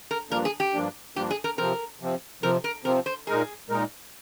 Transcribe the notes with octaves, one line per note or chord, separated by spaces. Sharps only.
A#4
G2 F3 A#3 D4 A#4
G#4
G4
G2 F3 A#3 D4
G2 F3 A#3 D4 G4
G#4
A#4
C3 F3 C4 A#4
C3 F3 C4
C3 F3 C4 A#4
A#4
C3 F3 C4 A#4
C5
A#2 G#3 D#4 G#4 A#4
A#2 G#3 D#4 A#4